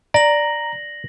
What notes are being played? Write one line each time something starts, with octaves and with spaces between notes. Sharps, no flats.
D5 A#5 A#6 F#7